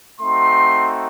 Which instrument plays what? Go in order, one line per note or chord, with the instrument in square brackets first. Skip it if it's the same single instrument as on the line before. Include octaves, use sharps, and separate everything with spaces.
[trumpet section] A3 C4 D#4 F#4 C6